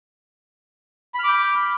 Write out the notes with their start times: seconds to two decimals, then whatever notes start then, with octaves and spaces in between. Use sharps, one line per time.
1.15 B5
1.19 F6
1.24 D6
1.28 G6